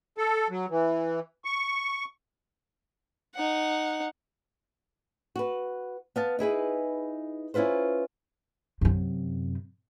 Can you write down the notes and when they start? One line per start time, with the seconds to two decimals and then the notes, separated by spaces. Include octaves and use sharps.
0.18 A4
0.50 F#3
0.70 E3
1.45 C#6
3.35 D#4 F#5
5.36 F#4 B4
6.16 B3 F5 A5
6.39 D#4 E4 G#4 B4
7.54 C#4 E4 F4 B4 C5
8.81 F#2 C3